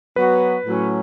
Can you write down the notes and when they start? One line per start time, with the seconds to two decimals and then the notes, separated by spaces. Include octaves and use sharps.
0.16 F#3 B3 F#4 B4
0.66 A2 F#3 C#4